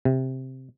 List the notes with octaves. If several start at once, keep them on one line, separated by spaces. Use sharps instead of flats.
C3